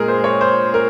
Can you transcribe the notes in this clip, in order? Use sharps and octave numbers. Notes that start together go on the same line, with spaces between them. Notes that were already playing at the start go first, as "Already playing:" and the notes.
Already playing: A#2 G#3 G#4 A#4
C5
C#5
C5
A#4